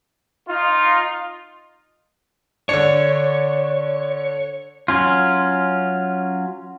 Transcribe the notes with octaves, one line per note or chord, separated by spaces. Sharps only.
D#4 F4
D3 D4 C#5
F#3 C#4 F4